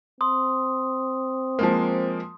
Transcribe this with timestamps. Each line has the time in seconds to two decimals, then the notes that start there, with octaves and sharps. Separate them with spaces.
0.21 C4 C6 D#6
1.59 F3 G#3 A#3